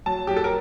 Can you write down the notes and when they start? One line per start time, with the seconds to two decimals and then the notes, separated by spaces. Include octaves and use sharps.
0.06 F#3 A5
0.27 F#3 G4
0.37 A4
0.44 A#4